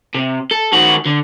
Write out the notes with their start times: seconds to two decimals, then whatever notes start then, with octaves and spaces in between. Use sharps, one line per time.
0.15 C3
0.51 A4
0.73 D#3 F#4
1.05 D3